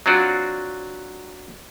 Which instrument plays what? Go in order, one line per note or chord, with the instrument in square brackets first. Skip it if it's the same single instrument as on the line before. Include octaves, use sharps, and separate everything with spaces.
[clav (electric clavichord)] F#3 C4 D4 F4 F#4